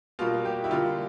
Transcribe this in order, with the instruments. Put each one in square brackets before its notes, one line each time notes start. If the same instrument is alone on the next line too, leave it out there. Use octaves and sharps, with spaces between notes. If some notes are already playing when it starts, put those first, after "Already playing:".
[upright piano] B2 G3 A#3 F4
G4
E4
D3 G3 A#3 F4